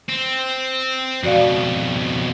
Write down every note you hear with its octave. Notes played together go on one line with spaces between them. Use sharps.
C4
F2 B2 F#4 D5 F5